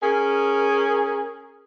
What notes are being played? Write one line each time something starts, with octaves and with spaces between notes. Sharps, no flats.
C#4 G#4 A#4